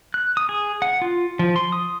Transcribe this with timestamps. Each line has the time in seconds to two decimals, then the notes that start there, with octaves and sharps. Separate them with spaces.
0.14 F#6
0.37 D#6
0.49 G#4
0.82 F#5
1.02 F4
1.39 F3
1.56 C6
1.72 D#6